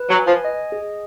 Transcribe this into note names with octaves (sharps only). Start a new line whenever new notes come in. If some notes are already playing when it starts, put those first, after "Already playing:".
Already playing: B4
F#3
G#5
F3
D#5
G#4